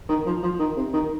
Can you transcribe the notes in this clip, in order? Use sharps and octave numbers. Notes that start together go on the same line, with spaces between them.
D#3
F3
F3
D#3
C3
D#3